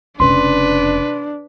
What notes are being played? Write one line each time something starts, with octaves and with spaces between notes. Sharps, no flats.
F1 C#3 D4 B4 C6